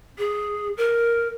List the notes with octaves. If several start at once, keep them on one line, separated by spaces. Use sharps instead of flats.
G#4
A#4